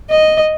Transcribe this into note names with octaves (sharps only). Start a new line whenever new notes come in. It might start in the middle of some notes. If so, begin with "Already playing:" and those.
D#5